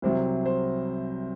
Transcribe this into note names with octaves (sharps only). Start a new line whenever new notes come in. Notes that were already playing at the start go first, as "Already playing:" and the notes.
C2 C3 F#3 C5
C5